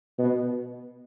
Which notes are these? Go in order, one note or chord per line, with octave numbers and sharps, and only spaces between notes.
B2